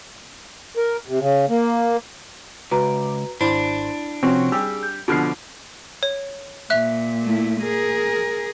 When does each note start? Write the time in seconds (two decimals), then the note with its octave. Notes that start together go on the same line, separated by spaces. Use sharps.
0.77 A#4
1.08 C3
1.19 C#3
1.49 A#3
2.71 C#2 F#4 B4 A#5 D6
3.41 G#1 D4 E4 C5 B5
4.23 C3 F3 C4 C#4 F#4 C#6
4.52 G3 G4 G#4 E6
4.83 G6
5.08 B2 D3 F3 B5 D6 F6 C7
6.03 C#5
6.70 A#2 E5 F#6
7.23 A3 E4
7.61 G#4 A#4